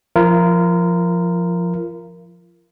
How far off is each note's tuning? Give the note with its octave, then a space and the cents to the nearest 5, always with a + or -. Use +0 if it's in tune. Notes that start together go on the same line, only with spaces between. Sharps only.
F3 +0 F4 -40 A#4 +0